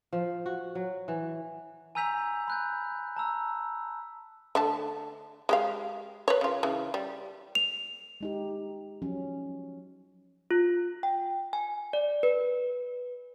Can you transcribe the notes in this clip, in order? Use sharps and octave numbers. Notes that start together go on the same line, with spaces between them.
F3
F#4
F#3
E3
G#5 A#5 E6 G6 B6 F7
B5 F#6 G6
A5 A#5 E6
D3 A3 A5
G#3 G4 F5
B4 C#5
C#3 F4
C#3 E3
G3
F7
G#3 D#4 G4
F3 F#3 C#4
F4
G5
G#5
D5
B4